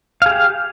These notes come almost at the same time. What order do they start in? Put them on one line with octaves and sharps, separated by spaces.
F5 G#4 G4